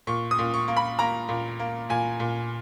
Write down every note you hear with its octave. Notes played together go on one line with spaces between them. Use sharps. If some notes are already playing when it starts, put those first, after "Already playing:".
A#2 C#6
D#6
A#2
C#6
A#3
B5
A#3 A#5
A#2
A#3
A#2 G#5
A#2